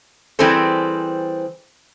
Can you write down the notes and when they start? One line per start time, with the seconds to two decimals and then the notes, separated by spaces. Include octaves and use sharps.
0.39 E3 G3 C4 G#4 A4 C5